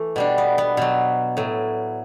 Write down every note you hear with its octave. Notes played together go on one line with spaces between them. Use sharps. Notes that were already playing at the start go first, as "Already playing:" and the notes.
Already playing: E3 A3
B2 G3 D4
B3
B3
B2 F#3
A2 F#3